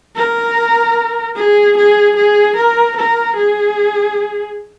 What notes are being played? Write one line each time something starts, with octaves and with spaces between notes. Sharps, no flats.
A#4
G#4
G#4
G#4
A#4
A#4
G#4